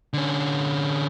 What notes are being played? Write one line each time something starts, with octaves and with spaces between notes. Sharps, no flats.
D3 C#4